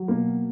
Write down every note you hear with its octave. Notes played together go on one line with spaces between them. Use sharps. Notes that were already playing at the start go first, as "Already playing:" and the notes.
Already playing: F#3
B2 A#3